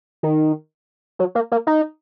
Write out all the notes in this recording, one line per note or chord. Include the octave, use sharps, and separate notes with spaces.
D#3
F#3
A#3
A#3
D#4